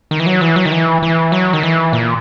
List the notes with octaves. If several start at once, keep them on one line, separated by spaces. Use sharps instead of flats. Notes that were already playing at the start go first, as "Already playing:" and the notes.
D#3
E3
F#3
E3
F#3
D#3
E3
E3
F#3
D#3
E3
A#2